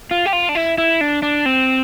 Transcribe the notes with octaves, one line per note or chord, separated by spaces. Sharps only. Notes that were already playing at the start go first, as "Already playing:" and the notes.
F4
G4
F4
D4
E4
E4
D4
D4
C4